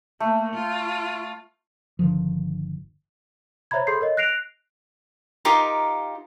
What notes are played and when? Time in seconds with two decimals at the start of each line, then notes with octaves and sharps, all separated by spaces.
0.20 A3 A#3
0.54 F4
1.99 G1 D3 D#3 F3
3.71 C5 C#5 E5 A#5 B5 G#6
3.87 G#4 A4 B5 C6 G6 C7
4.01 A#4 C#5 D#5
4.17 F#6 A#6 C7 D7 F7
5.45 D#4 F4 G4 A#4